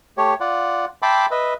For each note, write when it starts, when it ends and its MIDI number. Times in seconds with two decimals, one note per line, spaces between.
0.17 0.34 57
0.17 0.34 67
0.17 0.34 73
0.40 0.85 65
0.40 0.85 74
0.40 0.85 78
1.02 1.26 76
1.02 1.26 79
1.02 1.26 81
1.02 1.26 83
1.02 1.26 84
1.02 1.26 86
1.31 1.54 71
1.31 1.54 75
1.31 1.54 76